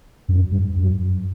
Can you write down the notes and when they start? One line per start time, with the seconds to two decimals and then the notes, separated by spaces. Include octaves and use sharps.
0.29 F#2
0.52 G2
0.76 F#2